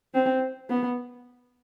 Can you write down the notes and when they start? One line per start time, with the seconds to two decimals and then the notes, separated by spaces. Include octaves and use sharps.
0.14 C4
0.70 B3